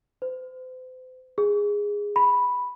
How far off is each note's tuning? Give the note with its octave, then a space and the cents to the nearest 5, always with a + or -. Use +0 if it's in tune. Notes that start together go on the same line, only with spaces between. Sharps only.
C5 -40
G#4 -10
B5 +0